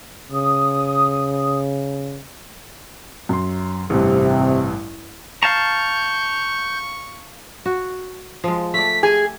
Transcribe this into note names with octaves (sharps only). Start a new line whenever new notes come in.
C#3 D#6
F#2 C6
A1 G2 C3
F5 A5 A#5 C#6 G6
F#4
F3 G#3
A3 D5 B6
G4 G#4 G#5